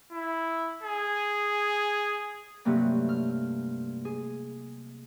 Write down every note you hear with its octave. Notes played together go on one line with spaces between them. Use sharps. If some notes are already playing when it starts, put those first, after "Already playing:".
E4
G#4
G2 C3 F#3 A3 A#3
F6
G#4